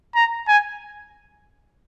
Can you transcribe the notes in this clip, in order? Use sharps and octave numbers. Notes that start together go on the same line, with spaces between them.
A#5
G#5